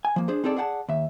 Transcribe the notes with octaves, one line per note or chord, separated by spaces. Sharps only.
G#5
F3 A#3
D4 G#4 C5
C4 D#4 G#4 A4 D5
G#4 D5 F#5 G5 A5
D#2 E5